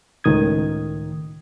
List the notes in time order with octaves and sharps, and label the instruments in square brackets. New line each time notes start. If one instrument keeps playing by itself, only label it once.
[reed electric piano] C#2 A2 D#3 D#6 G#6